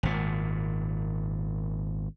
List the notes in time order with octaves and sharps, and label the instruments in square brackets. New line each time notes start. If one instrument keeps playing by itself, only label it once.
[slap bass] G#1 A#2